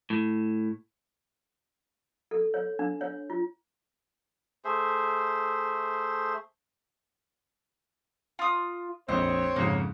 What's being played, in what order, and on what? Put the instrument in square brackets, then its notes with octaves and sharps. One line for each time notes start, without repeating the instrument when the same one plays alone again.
[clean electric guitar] A2
[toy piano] A4
C#5
D4
C#5
F4
[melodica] A3 G#4 C5 E5
[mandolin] F4 D#6
[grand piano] A#1 F2 [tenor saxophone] C4 [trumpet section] C#5 [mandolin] D#5
[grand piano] F2 G#2 C#3 [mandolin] A#3